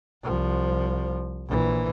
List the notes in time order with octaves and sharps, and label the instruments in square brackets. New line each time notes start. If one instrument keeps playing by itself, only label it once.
[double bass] C2 F3
A#1 E3